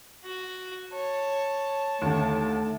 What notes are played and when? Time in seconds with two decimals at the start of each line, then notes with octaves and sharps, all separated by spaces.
0.24 F#4
0.93 C#5 A5
2.02 D#2 D3 A3